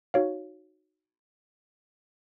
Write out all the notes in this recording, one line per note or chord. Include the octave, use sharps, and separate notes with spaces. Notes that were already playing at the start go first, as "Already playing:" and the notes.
D#4 F#4 C#5 F5